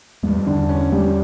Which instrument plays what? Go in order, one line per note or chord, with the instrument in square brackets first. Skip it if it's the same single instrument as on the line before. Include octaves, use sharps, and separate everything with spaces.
[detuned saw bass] E2 [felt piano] G2
[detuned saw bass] F2
[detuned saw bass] E2 [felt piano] D3
[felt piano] C#4
G3